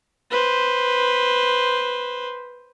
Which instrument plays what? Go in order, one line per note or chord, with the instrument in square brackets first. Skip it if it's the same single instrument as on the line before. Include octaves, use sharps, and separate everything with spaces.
[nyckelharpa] B4 C5